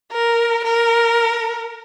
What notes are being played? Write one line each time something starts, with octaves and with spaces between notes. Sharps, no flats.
A#4
A#4